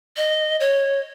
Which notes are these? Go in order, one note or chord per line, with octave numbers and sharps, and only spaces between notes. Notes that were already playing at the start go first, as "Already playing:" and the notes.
D#5
C#5